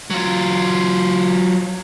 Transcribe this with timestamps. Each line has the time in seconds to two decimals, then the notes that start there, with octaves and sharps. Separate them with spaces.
0.10 F#3 F4